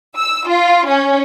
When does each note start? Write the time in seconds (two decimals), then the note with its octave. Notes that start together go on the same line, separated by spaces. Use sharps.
0.17 E6
0.48 F4
0.88 C#4